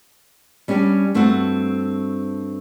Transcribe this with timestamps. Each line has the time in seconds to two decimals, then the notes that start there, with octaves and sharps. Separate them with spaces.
0.68 G3 C#4 D4 G4 B4
1.14 G2 A3 C4 F#4 F#5